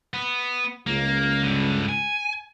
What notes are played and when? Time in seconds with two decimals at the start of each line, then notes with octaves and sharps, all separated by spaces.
0.14 B3
0.87 C#2 A#3
1.43 G2 D3
1.89 G#5